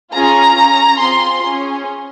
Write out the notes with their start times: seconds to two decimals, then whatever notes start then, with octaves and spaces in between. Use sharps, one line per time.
0.13 C#4 F4 G#4 A#5
0.56 C#4 G#4
0.99 C4 F4 G#4 C6
1.42 C#4 G#4